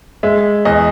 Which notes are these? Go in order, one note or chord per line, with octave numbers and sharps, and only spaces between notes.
G#3 E5
E2 D#5